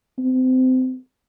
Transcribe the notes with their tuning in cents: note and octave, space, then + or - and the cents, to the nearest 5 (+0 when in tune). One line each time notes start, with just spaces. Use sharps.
C4 -30